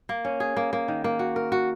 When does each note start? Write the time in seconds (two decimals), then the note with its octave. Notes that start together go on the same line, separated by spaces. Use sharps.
0.09 A#3
0.25 C#4
0.40 G#4
0.57 A#3
0.73 A#3
0.88 D#3
1.04 A#3
1.19 F#4
1.36 A#4
1.52 F#4